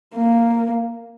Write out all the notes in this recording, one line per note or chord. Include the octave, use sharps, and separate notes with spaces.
A#3